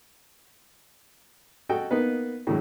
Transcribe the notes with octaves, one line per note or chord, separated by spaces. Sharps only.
F#4 A4 D#5 G5
A#3 B3 D#4 B4
A2 D3 E3 F#3 G#3